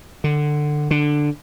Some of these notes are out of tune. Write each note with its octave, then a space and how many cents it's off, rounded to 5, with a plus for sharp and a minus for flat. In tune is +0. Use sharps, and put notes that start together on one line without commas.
D3 +20
D3 +10